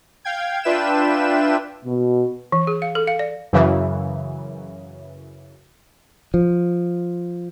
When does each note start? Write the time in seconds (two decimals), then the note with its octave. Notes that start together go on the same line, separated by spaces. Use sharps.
0.25 F5 G5 G#6
0.64 D4 F4 B4 E5 G5 E7
1.85 B2
2.52 E3
2.67 G#4
2.82 F5
2.95 A4
3.07 F5
3.19 D5
3.53 F#2 C#3 E3
6.34 F3